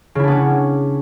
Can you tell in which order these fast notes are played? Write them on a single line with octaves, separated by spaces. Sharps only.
C#3 E4 D4 B3 C#4